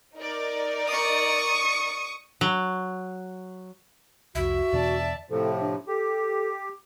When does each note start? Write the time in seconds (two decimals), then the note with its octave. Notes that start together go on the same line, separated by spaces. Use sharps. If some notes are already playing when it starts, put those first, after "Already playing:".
0.17 D#4 A#4 D5
0.88 C#6 D#6
2.41 F#3
4.35 C2 F2 F#4 E5
4.73 E2 B2 D3 D5 A5
5.30 A2 C3 F3 A4
5.60 D4
5.87 G4 A4